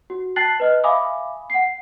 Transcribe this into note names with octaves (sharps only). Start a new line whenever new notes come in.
F#4
G5 A5 F#6 A6 C7 F#7
B4 D#5 F6
E5 F5 G#5 B5 D6 D#6
F#5 C7